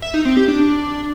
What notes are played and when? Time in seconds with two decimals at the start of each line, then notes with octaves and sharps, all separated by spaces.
0.02 E5
0.14 D#4
0.25 C4
0.37 G4
0.48 D4